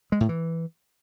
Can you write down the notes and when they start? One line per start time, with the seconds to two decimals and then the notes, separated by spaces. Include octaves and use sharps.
0.12 G#3
0.21 A2
0.29 E3